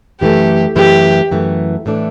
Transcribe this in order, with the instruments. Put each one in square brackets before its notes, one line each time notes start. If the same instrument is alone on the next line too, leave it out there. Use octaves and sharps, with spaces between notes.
[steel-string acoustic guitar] F#2 E3 A3 [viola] G4
[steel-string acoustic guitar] F#2 E3 A3 [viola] G4
[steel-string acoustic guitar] F#2 E3 A3
A2 E3 A3 D4